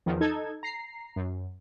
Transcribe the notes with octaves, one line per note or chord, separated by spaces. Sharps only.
E2 D#3 F3
D#4 A4 G#6
A#5 C7
F#2